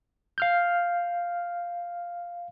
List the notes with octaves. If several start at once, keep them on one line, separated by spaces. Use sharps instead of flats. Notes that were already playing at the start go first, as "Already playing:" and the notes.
F5 F6 G6